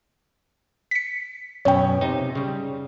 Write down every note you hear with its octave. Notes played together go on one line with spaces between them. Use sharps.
B6 C#7
F#2 B2 C#4 C#5 G5
C3 D#4
C#3 G3